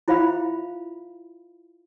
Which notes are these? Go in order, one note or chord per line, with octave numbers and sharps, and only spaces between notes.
E4 F4 C5 E5 F5 B5